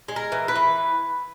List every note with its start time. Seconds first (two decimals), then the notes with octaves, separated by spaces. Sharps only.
0.08 G#3
0.16 A#4
0.32 E3
0.48 B4
0.56 E3